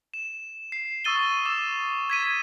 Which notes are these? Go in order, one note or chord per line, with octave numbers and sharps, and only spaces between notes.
E7
C7
C#6 D#6 E6 A6 D#7 G7
D6 E6 E7
G#6 B6 D#7